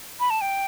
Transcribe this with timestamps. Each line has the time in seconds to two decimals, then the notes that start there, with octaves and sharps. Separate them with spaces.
0.20 B5
0.30 A5
0.41 G5